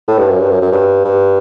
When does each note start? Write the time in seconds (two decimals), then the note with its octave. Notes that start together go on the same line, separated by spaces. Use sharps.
0.08 A2
0.18 G2
0.29 F#2
0.40 G2
0.50 F#2
0.62 F#2
0.72 G2
1.05 G2